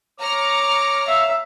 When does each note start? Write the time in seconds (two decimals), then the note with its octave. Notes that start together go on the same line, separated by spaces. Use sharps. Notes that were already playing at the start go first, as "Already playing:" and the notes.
0.20 C#5 A#5 D6 F6 C#7
1.07 E5 F5